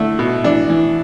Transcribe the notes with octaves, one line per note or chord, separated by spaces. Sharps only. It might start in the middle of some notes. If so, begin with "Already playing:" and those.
Already playing: D3 A3 E4
B2
E3 D4
E3